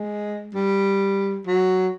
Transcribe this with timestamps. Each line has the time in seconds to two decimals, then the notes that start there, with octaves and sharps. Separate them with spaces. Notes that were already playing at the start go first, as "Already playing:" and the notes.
Already playing: G#3
0.54 G3
1.47 F#3